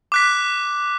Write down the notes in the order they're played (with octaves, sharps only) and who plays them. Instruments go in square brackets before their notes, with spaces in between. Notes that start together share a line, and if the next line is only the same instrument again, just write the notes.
[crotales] D6 F#6 B6